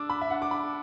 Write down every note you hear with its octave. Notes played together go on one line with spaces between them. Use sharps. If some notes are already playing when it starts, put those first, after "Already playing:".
Already playing: D4 D6 E6
B5
E5
D4 F#5
D6
B5